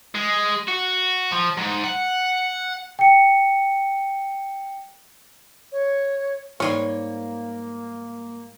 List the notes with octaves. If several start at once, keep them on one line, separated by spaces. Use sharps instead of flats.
G#3
F#4
F3
G#2
F#5
G5 C#7
C#5
G#2 G3 A#3 C#5 C6